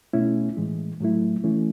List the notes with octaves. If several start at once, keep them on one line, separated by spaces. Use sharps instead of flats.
B2 A3 C#4 E4
A2 E3 G#3
A2 F#3 A3 E4
E3 A3 C#4 E4